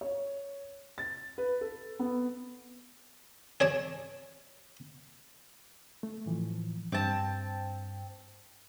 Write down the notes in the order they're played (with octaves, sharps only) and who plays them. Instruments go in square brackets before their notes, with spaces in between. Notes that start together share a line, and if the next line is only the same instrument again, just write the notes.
[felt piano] C#5
A6
B4
A4
B3
[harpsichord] G#4 C#5 D5 A5
[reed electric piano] A3
A2 E3 F3
[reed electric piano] G2 [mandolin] C4 A5